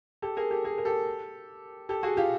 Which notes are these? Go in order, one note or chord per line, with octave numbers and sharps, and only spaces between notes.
G4 A4
G#4 A#4
G4 A4
G#4 A#4
A#4
G4 A4
G4 A4
F#4 G#4
F4 G4